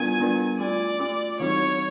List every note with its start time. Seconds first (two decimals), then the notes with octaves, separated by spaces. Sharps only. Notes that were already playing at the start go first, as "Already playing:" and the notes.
Already playing: G3 B3 D4 F4 A#4 G#5
0.20 G3 B3 D4 F4 A#4
0.60 A3 C#4 F4 D5
0.99 A3 C#4 F4
1.40 E3 G3 C4 D#4 F#4 C#5